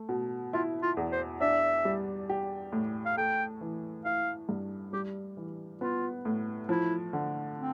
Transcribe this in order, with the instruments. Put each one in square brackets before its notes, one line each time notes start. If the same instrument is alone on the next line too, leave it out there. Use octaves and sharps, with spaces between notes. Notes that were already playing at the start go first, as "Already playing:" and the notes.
Already playing: [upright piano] A3
B2
[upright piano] E4 [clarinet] F4
[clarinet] F4
[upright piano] E2
[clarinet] C5
[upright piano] D4 [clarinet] E5
[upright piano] G3
G4
A2
[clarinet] F5
[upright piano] A3 [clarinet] G5
[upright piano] E3
[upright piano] E4 [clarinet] F5
[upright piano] G2
[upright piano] G3 [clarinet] G4
[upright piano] E3
[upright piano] B3 [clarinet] F4
[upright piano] A2
[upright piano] F3 [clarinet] E4
[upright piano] D3
[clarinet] C4